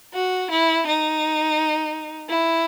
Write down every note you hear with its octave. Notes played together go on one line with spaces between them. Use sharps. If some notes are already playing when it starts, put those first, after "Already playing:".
F#4
E4
D#4
E4